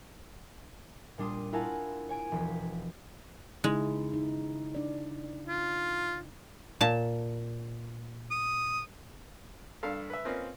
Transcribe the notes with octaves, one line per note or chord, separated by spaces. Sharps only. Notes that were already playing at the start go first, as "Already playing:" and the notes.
A#2 G3 D4 C6 D#6
E4 F4 A#4 F#5 G#5 A5
C#5 G#5 D7 D#7
E1 F3 B6
C#3 G#3 D#4 E4
D#4
D4 D5
F4
A#2 A5
D#6
G2 D4 A4 F5
B4 E5
A#3 C4 C#4 F4 B4 D#5